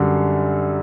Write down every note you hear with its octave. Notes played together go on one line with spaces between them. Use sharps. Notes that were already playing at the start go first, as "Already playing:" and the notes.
Already playing: F#2 D3 G3